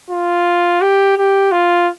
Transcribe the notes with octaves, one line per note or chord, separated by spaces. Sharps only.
F4
G4
G4
F4